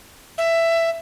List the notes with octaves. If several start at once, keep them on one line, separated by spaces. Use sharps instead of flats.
E5